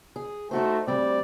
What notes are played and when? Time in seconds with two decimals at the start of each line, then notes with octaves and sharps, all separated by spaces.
0.16 G#4
0.51 A3 D#4 F#4 C5
0.87 D2 G3 C4 D5